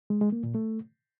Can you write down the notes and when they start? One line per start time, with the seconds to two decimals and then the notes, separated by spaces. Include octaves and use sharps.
0.10 G#3
0.21 G#3
0.32 A#3
0.44 A#2
0.55 A3